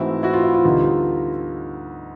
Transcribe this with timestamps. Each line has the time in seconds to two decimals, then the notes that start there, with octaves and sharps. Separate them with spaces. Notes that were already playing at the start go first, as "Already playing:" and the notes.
Already playing: G#2 E3 A3 C4 E4 F#4
0.23 E4 F#4
0.33 F4
0.43 E4
0.54 F4
0.64 D2 D3 G3 B3 D#4